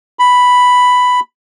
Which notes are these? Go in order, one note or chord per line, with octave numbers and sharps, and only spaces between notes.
B5